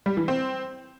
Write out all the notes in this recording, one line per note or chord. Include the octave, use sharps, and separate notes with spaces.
G3
E3
C4